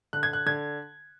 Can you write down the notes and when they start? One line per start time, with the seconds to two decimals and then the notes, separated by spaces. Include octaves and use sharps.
0.13 D3 F#6
0.23 G#6
0.33 F#6
0.46 D3 G#6